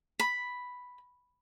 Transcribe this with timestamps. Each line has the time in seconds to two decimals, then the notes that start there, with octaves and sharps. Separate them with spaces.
0.20 B5